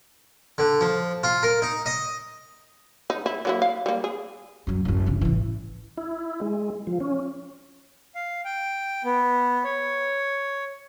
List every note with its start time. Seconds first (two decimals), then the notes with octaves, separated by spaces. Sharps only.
0.58 D3
0.81 F3
1.24 F4
1.43 A#4
1.62 D#4
1.86 D#5
3.10 D#4
3.26 E4
3.45 F#3 A#3 E4
3.62 F5
3.86 G3 A#3
4.04 G#4
4.67 F#2 F#3
4.85 A1 F#2
5.06 G1 C#3
5.21 A1 E3
5.97 E4
6.41 G#3
6.87 F3
7.00 C#4
8.15 F5
8.45 G5
9.04 B3
9.64 C#5